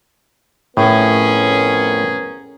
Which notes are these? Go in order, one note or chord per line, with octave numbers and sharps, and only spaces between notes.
F2 A2 B3 C#4 G#4 A#4